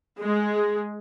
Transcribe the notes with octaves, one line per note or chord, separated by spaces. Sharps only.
G#3